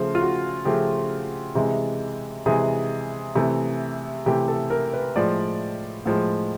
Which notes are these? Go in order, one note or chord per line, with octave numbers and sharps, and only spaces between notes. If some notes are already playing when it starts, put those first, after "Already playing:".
Already playing: C#3 F3 A3 C5
F4
F#4
C#3 F3 A3 G4
C3 E3 G#3
C3 E3 G#3 G#4
C3 E3 A3
C3 E3 A3 G4
A4
A#4
B4
A2 F3 G#3 D5
A2 F3 G#3